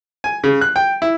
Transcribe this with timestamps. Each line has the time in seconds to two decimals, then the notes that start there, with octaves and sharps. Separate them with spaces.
0.24 G#5
0.44 C#3
0.61 F#6
0.76 G5
1.02 E4